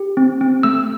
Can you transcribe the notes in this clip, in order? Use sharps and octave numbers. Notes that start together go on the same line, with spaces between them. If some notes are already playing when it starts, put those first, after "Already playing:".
Already playing: G4
C4
C4
A3 E6